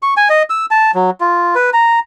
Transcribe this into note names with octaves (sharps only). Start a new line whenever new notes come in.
C#6
G#5
D#5
E6
A5
F#3
F4
B4
A#5